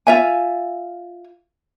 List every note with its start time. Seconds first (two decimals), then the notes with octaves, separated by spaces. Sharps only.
0.07 F4 E5 G#5